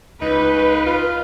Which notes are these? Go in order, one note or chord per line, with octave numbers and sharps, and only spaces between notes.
C#2 D#4 B4
F4